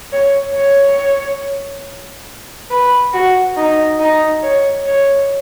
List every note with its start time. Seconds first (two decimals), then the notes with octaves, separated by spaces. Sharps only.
0.12 C#5
0.55 C#5
2.70 B4
3.13 F#4
3.57 D#4
4.00 D#4
4.43 C#5
4.86 C#5